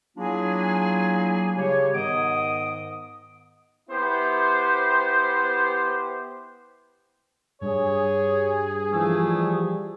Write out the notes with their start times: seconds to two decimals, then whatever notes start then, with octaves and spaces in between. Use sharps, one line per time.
0.17 F#3 A#3 D4 E4 F4 G#4
1.57 C#3 G3 G4 C#5
1.94 G#2 D#3 B3 D#5 D6 D#6
3.90 B3 E4 G4 C5
7.61 G2 G#4 C#5
8.92 E3 F3 G3 A3